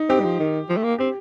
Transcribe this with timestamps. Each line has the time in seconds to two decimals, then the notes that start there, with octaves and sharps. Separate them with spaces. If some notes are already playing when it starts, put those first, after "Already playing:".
Already playing: D#4
0.09 C4 G4
0.20 G3
0.25 F3
0.39 D#3
0.69 F3
0.77 A3
0.83 A#3
0.98 C4 G4